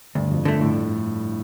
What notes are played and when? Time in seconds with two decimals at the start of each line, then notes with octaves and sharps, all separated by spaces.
0.15 D2 G2
0.31 F2
0.45 G2 D3 A3
0.60 A2